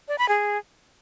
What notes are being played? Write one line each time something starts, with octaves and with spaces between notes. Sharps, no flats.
D5
B5
G#4